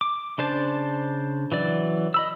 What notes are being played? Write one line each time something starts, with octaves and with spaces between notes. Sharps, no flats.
D6
C#3 D4 C5 A5
E3 F#3 D5
D#5 B5 E6